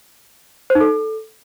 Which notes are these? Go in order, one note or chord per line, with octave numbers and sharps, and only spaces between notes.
C5
D#4
A4